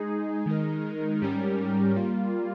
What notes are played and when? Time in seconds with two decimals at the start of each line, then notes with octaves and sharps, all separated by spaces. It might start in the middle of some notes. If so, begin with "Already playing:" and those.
Already playing: G#3 D#4 G#4
0.46 D#3 G#3 D#4 A#4
1.22 G#2 G3 C#4 G4 A#4
1.96 G3 A#3 F4